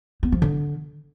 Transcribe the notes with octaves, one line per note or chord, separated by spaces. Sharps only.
B3
F3
D3